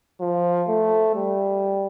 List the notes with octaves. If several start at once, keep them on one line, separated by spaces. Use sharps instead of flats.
F3
A3
G3